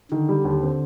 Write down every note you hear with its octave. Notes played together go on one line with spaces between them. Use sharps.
D3 D#3
G3
D#2
C4